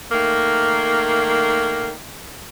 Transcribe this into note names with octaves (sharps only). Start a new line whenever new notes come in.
D#3 A3 A#3